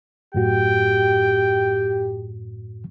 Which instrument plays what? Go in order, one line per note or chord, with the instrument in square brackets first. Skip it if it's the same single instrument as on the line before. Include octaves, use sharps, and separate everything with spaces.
[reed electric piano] F#2 A2 F#4 [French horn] G4 [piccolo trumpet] G5